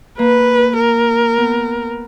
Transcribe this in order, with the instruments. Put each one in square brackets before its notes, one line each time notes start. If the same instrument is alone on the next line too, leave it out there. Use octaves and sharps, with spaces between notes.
[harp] A#3 [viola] B4
[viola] A#4
[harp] B3